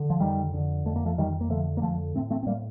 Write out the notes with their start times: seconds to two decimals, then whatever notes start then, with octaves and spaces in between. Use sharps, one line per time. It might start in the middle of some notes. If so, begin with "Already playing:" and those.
Already playing: D3
0.10 F3
0.20 F2 D#3 G3
0.54 D3
0.85 F2 A3
0.96 A#3
1.06 F3 A3
1.17 F2 D#3 G3
1.41 A#3
1.50 D3 F3 A3
1.77 A#3
1.82 F2 F3 A3
2.14 A2 A3 C4
2.30 A3 C4
2.43 C4
2.46 A2 G3 A#3